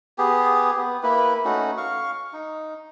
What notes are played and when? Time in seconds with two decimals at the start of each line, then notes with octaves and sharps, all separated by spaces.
0.18 B3 G4 G#4
0.77 B3
1.03 A#3 E4 B4
1.45 A3 C#4 D#4 F#4
1.77 F5 C#6
2.33 D#4